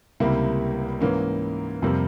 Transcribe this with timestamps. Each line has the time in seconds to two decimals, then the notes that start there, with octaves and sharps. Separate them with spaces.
0.20 C#2 C3 G3 A#3 E4
1.01 G#2 E3 A#3 C#4
1.82 F2 C3 G3 A#3